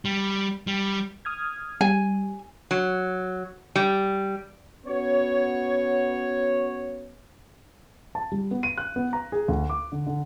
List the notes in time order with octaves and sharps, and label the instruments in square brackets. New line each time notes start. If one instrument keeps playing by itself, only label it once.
[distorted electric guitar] G3
G3
[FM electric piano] D#6 F6 G#6
[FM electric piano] G3 [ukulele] G#5
[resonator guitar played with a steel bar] F#3
G3
[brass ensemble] B3 C#4 F#4 C#5
[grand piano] A5
G3
B3
D#7
F#6
B3
A#5
G#4
D2
D6
D3
D3